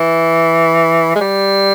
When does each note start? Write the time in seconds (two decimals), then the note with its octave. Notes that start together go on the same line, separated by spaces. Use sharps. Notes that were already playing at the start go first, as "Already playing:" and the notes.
Already playing: E3
1.16 G#3
1.21 G3